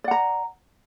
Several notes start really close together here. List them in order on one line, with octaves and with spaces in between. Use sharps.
D5 F#5 A#5